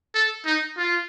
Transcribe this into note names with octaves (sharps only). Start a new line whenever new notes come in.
A4
D#4
F4